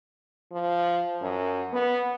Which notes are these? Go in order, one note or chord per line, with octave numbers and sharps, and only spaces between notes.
F3
F#2
B3